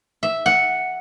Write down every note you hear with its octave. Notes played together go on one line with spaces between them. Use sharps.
E5
F#5